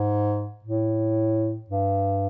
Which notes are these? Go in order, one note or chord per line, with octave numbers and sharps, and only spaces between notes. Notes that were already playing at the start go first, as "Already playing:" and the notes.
Already playing: G#2
A2
G2